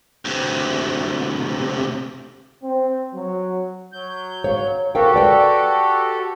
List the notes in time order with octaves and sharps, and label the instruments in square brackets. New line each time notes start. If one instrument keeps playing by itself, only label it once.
[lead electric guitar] D2 C3
[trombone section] C4
F#3
[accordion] F#3 G6
[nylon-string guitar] C#5 F5
[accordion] F#4 G4 A4 [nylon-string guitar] A#4 F5 G5
[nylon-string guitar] B4 D5 G5